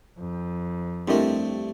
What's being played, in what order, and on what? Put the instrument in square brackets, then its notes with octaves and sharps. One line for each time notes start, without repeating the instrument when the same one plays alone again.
[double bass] F2
[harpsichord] G2 A3 [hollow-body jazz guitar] C4 G4 D#5 [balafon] D4 E4 A#4